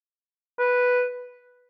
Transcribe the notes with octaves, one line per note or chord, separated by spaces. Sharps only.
B4